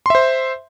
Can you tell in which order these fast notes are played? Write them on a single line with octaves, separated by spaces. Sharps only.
C6 E5 C5